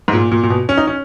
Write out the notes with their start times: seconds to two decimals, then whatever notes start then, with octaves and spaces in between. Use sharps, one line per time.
0.08 G#2
0.13 A#2
0.32 A#2
0.43 A#2
0.50 B2
0.69 C#4
0.77 D#4
0.87 C#4